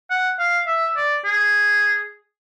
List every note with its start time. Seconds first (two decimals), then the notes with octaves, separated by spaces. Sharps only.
0.10 F#5
0.39 F5
0.67 E5
0.97 D5
1.25 G#4